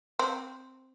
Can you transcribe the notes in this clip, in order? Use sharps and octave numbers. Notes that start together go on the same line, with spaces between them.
C4